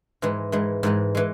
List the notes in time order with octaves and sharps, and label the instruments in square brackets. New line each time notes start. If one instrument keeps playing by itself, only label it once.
[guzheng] G#2 E3 G#3
G#2 E3 G#3
G#2 E3 G#3
E3 G#3